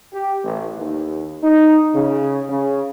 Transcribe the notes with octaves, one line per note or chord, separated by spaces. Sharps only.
G4
A1
D#2
D#4
C#3
C#3